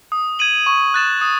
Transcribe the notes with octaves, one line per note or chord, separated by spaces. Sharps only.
D#6
G#6 D#7 F#7
C#6
F#6 A6 E7
D#6